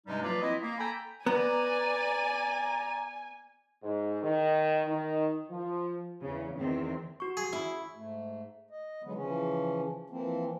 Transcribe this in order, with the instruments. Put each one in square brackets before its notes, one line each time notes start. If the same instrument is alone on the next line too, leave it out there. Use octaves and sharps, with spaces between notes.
[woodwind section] G2 C3 G3 G#3 C#4 D#4
F3 F#3 A#3 F4 B4 D5
C4 E4 D#5
A#3
A4 G5 G#5 A#5 B5
[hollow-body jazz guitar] B3 [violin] D5 D#7 [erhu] G#5 [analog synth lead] A#5
[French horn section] G#2
D#3
D#3
F3
[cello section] E2 C#3
E2 D#3 C4
[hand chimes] F#4 C#6
[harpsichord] G#4
[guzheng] E4
[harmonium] G#2 A3
D#5
D3 E3 F#3 G#3 B3
C#3 E3 F3 C#4
E3 F3 A#3 C4